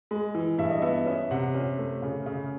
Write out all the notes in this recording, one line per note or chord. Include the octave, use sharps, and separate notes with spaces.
G#3
E3
G2 E5
D#5
B3 E5
C#4 E5
C3 F#5
C#4
A3
C#3
C#3